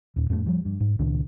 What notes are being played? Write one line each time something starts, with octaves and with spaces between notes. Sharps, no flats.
D#2 A#2
F2 A2 G#3 A3
F3 G3
G2
G#2
C#2 A#2 D#3 D4